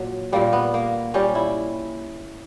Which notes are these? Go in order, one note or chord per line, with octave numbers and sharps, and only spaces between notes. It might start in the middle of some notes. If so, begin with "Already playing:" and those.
Already playing: A#2 F#3
A#2 G3 A#3
B3
A#3
A#2 G3 C#4
E4